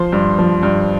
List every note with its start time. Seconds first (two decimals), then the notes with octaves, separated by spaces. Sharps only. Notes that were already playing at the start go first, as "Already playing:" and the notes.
Already playing: F3 C5 C6
0.12 G2
0.39 F3
0.63 G2